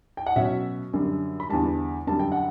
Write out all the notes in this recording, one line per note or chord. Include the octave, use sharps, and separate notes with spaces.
G5
F#5
B2 F#3 C#4 E5
F#2 D3 G3
B5
E2 D3 G3 A5
F#2 D3 G3 A5
G5
F#5